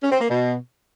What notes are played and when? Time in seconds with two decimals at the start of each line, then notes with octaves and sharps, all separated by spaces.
0.03 C#4
0.12 C4
0.21 A#3
0.30 B2